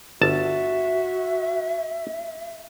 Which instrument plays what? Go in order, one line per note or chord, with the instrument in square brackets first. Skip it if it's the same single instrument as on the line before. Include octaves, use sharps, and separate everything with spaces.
[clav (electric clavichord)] G1 A5 [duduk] F#4 [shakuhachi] E5